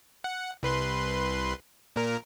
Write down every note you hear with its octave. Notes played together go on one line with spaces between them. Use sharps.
F#5
C2 B4 C6
A#2 A#4